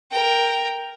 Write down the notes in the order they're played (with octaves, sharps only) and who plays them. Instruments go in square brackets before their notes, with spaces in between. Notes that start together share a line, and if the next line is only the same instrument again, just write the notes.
[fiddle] A#4 G5